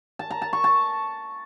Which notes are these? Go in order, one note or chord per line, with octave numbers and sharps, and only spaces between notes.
A5
A#5
A5
C#6
A5